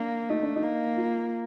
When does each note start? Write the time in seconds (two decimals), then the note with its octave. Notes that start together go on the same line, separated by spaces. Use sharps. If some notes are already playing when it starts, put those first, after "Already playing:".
Already playing: A#3 D4
0.29 A3 D#4
0.42 D4
0.56 D#4
0.63 A#3
0.97 F4